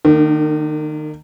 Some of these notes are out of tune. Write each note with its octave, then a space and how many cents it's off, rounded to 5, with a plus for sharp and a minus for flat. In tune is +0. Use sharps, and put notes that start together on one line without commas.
D#3 -25 A#3 -35 D4 +20